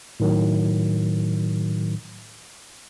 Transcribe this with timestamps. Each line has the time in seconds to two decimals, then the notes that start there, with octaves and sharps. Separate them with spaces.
0.20 A2 D#3 F#3